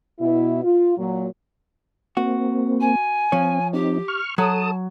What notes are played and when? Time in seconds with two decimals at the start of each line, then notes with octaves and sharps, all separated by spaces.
0.20 B2 E4
0.64 F4
0.98 A#2 F#3
2.17 A#3 C4 F#4
2.80 G#5
3.32 F3 C4 C#5
3.73 C4 D#4 G4
4.08 C#6 F6
4.38 F#3 A4 A5 D#6